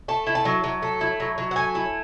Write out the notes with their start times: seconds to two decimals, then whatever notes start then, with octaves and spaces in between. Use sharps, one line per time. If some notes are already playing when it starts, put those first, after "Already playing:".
0.08 A3 A5
0.27 E4
0.35 A5
0.45 F#3
0.64 F#3
0.82 A3
1.01 E4
1.20 F#3
1.38 F#3
1.51 F#5
1.56 A3 G#5
1.75 E4